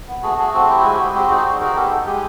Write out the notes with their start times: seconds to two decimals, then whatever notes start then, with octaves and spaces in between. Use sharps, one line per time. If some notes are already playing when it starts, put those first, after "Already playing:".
0.08 B3
0.23 A3 F#4 G#4
0.38 A3 F#4 G#4
0.54 C4 F#4
0.69 E4 G4
0.81 G#3 F#4
0.93 G4
0.99 F#4
1.15 C4 G4
1.30 D#4 F#4 G#4
1.45 G3
1.61 F#4 G#4 A#4
1.76 B3 G4 A4
1.91 D#4
2.06 G#3 G4